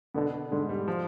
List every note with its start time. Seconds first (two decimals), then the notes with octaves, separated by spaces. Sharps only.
0.14 B2 D3 B3
0.51 G#2 D3 G#3
0.69 G3
0.88 F3